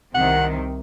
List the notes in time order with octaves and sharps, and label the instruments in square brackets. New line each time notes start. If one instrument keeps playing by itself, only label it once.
[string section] C2 C3 D#3 [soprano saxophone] F#5